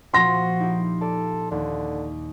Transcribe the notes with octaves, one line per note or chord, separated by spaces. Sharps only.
A#2 F3 C4 F#4 C6 A#6
D#4 E4 G4
A4 D5
D#2 D3